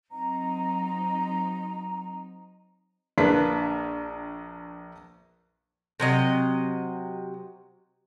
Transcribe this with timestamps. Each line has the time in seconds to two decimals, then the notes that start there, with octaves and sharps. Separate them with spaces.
0.12 F#3 C4 D#4 A#5
3.18 A#1 A#3 D4 B4 B6
6.00 C3 F#3 D#5